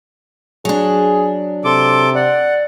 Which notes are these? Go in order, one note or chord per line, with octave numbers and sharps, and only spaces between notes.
F#3 D4 G#4
C3 A4 C6 D6
D5 F#5